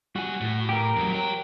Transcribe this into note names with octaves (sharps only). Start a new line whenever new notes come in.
G3 F#4 G#5
A2
G4 A#4
F2 F#3
C#5 A#5